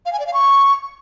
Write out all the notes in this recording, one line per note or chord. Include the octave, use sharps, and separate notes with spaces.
F5
G#5
D5
F5
C#6